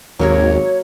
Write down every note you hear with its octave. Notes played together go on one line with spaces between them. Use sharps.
G#1 D#2 F#3 A#3 A#4 C#5